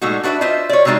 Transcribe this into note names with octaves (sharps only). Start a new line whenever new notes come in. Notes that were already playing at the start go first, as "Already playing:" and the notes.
A#2 G#3 A3 D#4 F#4
D4 F#4 B4 D5 E5
F4 C5 D#5 E5
C#5 D5
C3 G3 G#3 D#4 F4 F#4